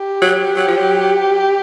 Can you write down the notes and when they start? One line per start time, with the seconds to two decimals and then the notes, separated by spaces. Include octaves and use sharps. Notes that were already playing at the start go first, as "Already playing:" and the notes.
Already playing: G4
0.22 F#3
0.56 F#3
0.67 F3
0.78 F#3